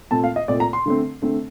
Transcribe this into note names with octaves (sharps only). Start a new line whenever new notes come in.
A#2 A3 C4 A5
F5
D#5
A#2 A3 C4 D5
A#5
C6
D3 A3 C4
D3 A3 C4